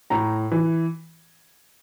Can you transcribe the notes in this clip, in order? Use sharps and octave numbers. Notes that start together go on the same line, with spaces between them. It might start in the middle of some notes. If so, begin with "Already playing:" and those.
A2 A#5
E3